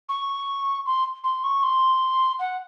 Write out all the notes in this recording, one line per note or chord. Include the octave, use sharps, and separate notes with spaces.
C#6
C6
C6
C#6
C6
F#5